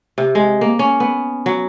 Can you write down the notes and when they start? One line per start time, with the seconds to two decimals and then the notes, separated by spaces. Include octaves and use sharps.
0.18 C3
0.35 G#3
0.61 A#3
0.79 C#4
1.00 B3
1.46 F#3